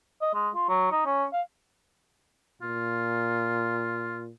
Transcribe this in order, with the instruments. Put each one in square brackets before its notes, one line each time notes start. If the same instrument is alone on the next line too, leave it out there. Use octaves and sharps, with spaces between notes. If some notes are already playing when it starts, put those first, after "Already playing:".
[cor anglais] D#5
G#3
F4
F#3
D#4
C#4
F5
[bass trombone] A#2 [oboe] F4